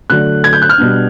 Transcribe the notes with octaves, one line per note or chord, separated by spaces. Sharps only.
D3 F#3 A3 F#6
G#6
G6
F#6
F6
B2 G3 B3 D4